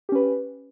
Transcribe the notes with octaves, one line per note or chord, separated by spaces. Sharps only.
C#4 G4 B4